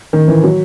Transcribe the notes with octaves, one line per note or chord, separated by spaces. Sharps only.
D#3
E3
F#3